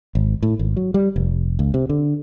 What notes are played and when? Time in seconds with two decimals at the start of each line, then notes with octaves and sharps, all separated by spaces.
0.15 G#1
0.43 A2
0.59 G#1
0.77 F#3
0.94 G3
1.16 F1
1.59 C#2
1.74 C3
1.89 D3